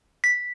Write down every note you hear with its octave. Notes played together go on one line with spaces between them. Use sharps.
B6